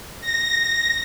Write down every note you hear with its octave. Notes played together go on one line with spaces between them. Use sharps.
A#6